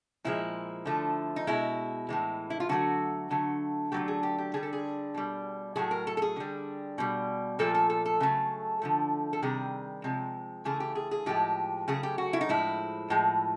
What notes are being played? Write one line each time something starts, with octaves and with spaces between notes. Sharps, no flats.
A#2 F3 G#3 E4
D3 F3 A3
D#4
B2 G#3 E4
A2 E3 G#3
E4
F4
D3 F#3 A3 F#4
D3 F#3 A3
D3 F#3 A3 G4
G#4
G4
G4
D3 G3 G#4
A4
G#4
B2 G3
A2 F#3 A3 G#4
A#4
A4
A4
G#4
D3 G3
B2 G3
A#2 F3 A3 A4
A4
A4
A4
C#3 F#3 A3
D3 F3 A3
A4
C3 D#3 G3 G#4
C3 F3 G#3
C#3 E3 A3 G#4
G4
G#4
G#4
A2 F3 G#3 G4
C#3 F#3 A3 G#4
G4
F#4
E4
D#4
A2 F3 G#3 E4
A2 F3 G#3